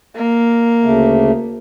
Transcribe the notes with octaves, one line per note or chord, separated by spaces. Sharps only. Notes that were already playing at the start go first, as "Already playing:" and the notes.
A#3
D2 C#3 A3